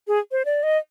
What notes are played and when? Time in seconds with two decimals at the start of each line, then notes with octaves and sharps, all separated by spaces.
0.08 G#4
0.32 C5
0.45 D5
0.63 D#5